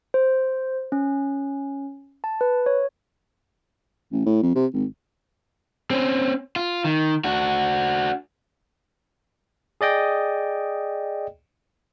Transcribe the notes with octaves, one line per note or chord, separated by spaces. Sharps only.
C5
C#4
A5
B4
C#5
A1
A2
F2
C3
G#1
C4 C#4
F4
D#3
D4 F#4
G#4 D5 D#5 G5